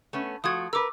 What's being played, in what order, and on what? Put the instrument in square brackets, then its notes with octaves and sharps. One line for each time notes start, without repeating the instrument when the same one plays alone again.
[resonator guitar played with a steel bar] A3 B3 C#4
[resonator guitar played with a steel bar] F3 A3 F#4 [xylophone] D#6 G#6
[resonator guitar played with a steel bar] A#4 B4 [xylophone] D6 E6